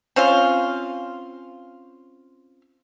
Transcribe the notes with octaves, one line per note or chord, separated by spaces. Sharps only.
C4 C#4 F4 F5